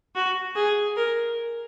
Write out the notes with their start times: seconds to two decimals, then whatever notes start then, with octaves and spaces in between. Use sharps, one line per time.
0.15 F#4
0.55 G#4
0.96 A#4